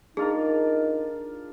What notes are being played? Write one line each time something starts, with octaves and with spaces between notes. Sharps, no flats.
D4 D#4 F4 G#4 A#4